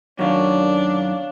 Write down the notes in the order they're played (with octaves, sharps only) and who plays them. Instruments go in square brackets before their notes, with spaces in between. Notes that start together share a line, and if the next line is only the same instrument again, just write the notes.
[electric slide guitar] F#2 D#3 [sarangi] D4 [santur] C#5 D5 F5